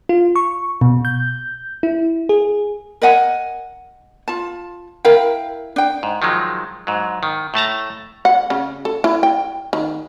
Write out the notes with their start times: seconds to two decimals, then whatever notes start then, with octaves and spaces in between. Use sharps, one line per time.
0.09 F4
0.36 C#6
0.81 B2
1.05 G6
1.83 E4
2.29 G#4
3.02 A#4 D#5 F#5 G#5
4.28 F4 A5
5.05 E4 A#4 F5 G5
5.76 D4 G5
6.03 G#2
6.22 D#3 F3 F#3 G#3
6.87 G#2 F#3
7.23 D#3
7.54 A2 A3 A5 A#5
8.25 F#5
8.50 C#3
8.85 A4
9.04 E4
9.23 G5
9.73 D#3